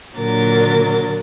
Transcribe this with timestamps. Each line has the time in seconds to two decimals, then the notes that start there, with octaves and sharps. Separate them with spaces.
0.17 A#2 D3 F#3 A#4 A6